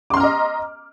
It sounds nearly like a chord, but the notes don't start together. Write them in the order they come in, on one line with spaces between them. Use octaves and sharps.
D6 C6 F6 A#5 D#5